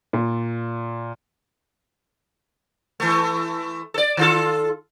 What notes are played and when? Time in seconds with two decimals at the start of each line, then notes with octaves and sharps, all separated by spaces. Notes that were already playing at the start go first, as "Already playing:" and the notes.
0.13 A#2
3.00 E3 A3
3.94 A4 D5
4.17 D#3 F4 A4